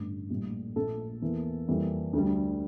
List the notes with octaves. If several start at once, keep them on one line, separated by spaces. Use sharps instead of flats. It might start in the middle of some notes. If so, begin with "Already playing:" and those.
Already playing: A1 G2 D3
A#1 A2 G3
A#1 A#2 A3 A4
E2 E3 A#3
F2 E3 G3 A#3
D2 D3 G3